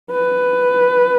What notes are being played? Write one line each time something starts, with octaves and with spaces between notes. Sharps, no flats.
B4